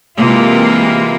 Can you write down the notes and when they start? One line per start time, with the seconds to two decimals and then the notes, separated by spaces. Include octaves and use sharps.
0.17 C3 E3 G#3 A#3 F4